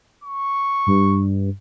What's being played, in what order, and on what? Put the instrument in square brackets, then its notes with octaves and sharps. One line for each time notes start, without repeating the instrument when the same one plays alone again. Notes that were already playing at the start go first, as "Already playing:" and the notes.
[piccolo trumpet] C#6
[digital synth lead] G2